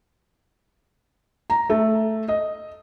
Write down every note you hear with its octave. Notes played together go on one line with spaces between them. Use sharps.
A#5
A3
D#5